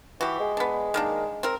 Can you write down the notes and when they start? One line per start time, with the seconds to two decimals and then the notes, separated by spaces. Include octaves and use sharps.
0.21 E3 F#4 G4
0.40 G#3
0.57 B3 D4
0.94 D#3 A#3 D4
1.43 C4 A#4